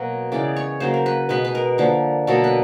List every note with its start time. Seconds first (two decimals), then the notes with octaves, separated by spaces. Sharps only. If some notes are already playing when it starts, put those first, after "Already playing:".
Already playing: B2 F#3 A#3 C#5
0.32 C#3 E3 G#3 B3 D5
0.56 C#5
0.80 C#3 F#3 A#3 C5
0.94 A#4
1.06 B4
1.29 B2 G#3 B3 B4
1.45 B4
1.55 A#4
1.78 D3 F3 A#3
2.27 B2 F#3 A#3 A4
2.44 B4